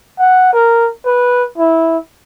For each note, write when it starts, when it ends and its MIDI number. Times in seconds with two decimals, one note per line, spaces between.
0.19 0.51 78
0.54 0.88 70
1.06 1.44 71
1.58 1.98 64